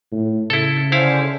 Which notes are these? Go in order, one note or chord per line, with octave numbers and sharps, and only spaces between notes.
A2
C#3 E4 A4
D3 C#4 E4 C5 F5